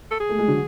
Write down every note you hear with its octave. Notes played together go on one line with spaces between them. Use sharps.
A4
G#4
A3
G#3
D3 F#3